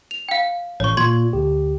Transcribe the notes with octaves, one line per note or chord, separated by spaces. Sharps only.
F7
F5 G5
A1 C#5 C#6
A#2 C6 G#6
D2 G4